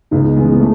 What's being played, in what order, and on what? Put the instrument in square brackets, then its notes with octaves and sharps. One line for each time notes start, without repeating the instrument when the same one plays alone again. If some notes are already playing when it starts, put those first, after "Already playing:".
[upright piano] C#2 B3 D#4
C#3 E3 G#3 B3
B3
A3